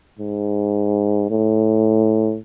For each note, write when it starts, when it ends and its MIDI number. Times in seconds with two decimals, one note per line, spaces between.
0.19 1.29 44
1.30 2.38 45